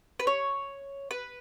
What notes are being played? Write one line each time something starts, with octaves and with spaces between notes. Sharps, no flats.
B4
C#5
B4